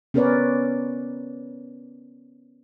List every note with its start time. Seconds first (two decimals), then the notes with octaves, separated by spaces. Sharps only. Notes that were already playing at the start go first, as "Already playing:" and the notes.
0.14 B3 C#4 A#4 B4 C#5 D5